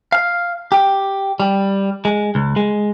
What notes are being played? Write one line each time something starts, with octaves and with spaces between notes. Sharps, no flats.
F5
G4
G3
G#3
C#2
G#3